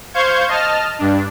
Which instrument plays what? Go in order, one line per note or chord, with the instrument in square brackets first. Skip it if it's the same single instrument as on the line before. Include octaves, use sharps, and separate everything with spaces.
[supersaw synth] C5 F5 C#6 G6 G#6
D#5 A5 F6
G2 D4